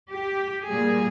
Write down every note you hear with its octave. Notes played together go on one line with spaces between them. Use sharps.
G4
A#2 G3 A#3 G#4